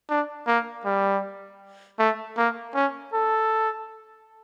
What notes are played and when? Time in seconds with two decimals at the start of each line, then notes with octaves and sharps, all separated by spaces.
0.09 D4
0.47 A#3
0.85 G3
1.99 A3
2.37 A#3
2.75 C#4
3.13 A4